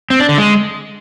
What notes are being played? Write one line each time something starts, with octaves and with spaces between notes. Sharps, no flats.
C4
D4
D3
G#3